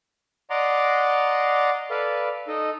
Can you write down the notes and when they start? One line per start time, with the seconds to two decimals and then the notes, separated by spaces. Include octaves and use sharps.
0.50 D5 D#5 F#5 A#5 C6 D6
1.90 A4 B4 D5 F5
2.48 D#4 A4 D#5